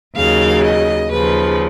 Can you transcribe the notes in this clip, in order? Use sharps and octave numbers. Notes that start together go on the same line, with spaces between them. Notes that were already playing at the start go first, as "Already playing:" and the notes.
D#2 C#3 F#3 F5
D#5
D#2 C#3 F3 B4